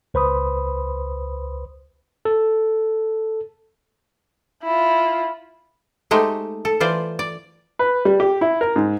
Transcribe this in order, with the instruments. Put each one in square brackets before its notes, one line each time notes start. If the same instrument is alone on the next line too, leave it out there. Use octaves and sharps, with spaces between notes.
[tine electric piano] C#2 B4 C5 B5 C6 D#6
A4
[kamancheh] E4 F4
[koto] G#3 A3 D#4 G4 C5
A4
E3 F4 C5 D5
D5
[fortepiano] B4
G3
G4
E4
A#4
G#2